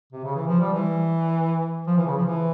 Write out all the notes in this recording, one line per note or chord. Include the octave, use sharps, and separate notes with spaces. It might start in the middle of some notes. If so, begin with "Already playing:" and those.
C3
C#3
E3
F3
G3
E3
F3
E3
C#3
F3
E3